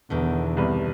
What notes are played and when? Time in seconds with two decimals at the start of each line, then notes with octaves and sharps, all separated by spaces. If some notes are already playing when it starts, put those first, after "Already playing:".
0.10 E2 B2 D3 D#3
0.57 C2 G2 B4